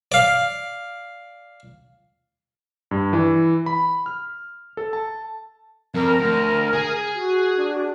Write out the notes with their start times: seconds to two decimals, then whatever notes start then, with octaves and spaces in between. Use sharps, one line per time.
0.12 D5 F5
2.91 G2
3.13 E3
3.66 B5
4.06 F6
4.77 A4
4.93 A5
5.95 F2 A#4
6.20 D2
6.73 G#4 G#5
7.15 F#4
7.56 D4